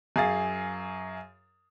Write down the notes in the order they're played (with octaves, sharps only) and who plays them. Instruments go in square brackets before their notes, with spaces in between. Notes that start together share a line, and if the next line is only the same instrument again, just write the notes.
[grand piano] F#2 G#4 F5 A6